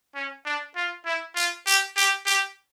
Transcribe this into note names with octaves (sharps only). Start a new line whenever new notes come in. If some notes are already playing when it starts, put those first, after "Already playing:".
C#4
D4
F4
E4
F4
G4
G4
G4